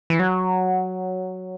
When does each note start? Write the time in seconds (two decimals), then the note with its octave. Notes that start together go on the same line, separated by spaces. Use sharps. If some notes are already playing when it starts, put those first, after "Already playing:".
0.10 E3
0.19 F#3